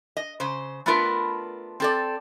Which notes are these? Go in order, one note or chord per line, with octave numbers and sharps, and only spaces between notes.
D#5
C#3 C5
A3 B3 D4 F4 A#4 B4
C4 A4 D5